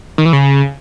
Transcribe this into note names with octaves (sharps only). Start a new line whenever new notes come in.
D#3
E3
C#3